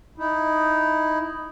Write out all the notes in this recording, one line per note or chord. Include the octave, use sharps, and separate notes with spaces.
D#4 E4